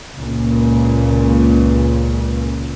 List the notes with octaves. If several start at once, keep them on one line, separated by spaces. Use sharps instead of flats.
C#2 A#2 C#3